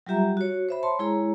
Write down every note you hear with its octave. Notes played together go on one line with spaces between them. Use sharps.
F#3 G3 F4 G4 E5 A#5
F#4 C#5
C5 E5 B5
C#5 A5 C6
G#3 E4 G#4 C#5 A#5